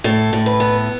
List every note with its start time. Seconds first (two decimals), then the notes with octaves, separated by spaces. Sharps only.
0.04 A2 A4
0.33 A2
0.46 B4
0.60 B3